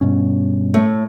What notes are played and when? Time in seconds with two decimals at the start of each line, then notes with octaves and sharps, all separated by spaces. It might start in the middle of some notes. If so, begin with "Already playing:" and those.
0.01 G2 B2 C#4
0.74 A2 A3